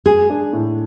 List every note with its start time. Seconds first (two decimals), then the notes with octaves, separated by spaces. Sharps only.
0.06 G#3 G#4
0.30 D4
0.53 A2